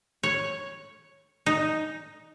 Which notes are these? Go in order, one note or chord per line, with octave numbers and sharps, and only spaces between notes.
C#5
D#4